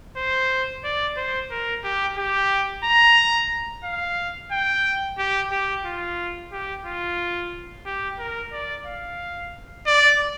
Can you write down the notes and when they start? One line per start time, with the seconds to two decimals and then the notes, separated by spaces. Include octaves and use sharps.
0.17 C5
0.84 D5
1.17 C5
1.51 A#4
1.84 G4
2.17 G4
2.84 A#5
3.84 F5
4.51 G5
5.18 G4
5.52 G4
5.85 F4
6.52 G4
6.85 F4
7.86 G4
8.19 A#4
8.53 D5
8.86 F5
9.86 D5